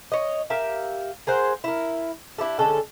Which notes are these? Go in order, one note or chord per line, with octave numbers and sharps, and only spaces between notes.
C#5 D#5
G4 A#4 E5 F5
G#4 A#4 C5 F#5
E4 A#4
D4 E4 G4 A4
D3 G#3 C#4 A4